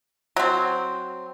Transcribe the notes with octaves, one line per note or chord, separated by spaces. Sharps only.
F#3 C4